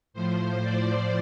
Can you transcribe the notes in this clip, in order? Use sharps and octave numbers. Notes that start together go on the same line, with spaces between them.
A2 F3 C5
D5